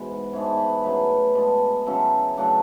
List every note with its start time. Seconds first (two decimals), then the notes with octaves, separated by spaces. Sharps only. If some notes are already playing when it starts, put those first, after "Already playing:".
Already playing: G#2 B2 E3 G#3 B3 E4 C#5
0.33 G#2 E3 G#3 D4 C#5
0.58 B4
0.83 C#3 F#3 A3 B4
1.35 B2 G#3 D4
1.86 C#3 F#3 C#4 E4 A4
2.37 C#3 F#3 A3 D4